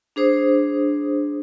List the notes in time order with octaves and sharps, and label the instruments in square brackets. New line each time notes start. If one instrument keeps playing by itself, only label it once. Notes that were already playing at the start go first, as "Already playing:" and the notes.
[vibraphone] D4 G#4 C5 D#6